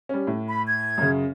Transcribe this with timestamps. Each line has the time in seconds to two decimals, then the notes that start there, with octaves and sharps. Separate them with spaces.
0.09 G3 C#4
0.27 A2
0.48 B5
0.66 G#6
0.98 F#2 C#3